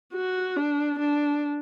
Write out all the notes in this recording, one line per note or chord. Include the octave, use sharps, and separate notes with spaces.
F#4
D4
D4